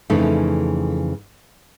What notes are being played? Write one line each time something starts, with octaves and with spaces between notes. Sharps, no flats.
F2 C#3 E3 A3 D#4